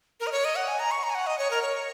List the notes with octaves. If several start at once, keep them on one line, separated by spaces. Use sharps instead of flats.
A#4
D#5
C#5
D#5
F#5
G#5
A#5
C#6
A#5
G#5
F#5
D#5
C#5
A#4
C#5